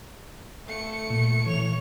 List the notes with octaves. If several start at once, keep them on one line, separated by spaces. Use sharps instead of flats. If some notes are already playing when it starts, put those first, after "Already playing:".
A3 C#7
A#2
E3 C#5 F7